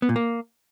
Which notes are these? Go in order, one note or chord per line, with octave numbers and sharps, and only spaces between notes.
B3
A#2
A#3